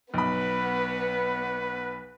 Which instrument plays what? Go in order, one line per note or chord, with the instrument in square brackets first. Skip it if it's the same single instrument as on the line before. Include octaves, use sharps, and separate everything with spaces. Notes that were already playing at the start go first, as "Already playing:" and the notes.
[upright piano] B1 B5 [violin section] B3 [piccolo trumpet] B4